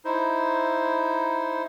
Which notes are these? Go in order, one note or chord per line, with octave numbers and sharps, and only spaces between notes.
D#4 E4 C5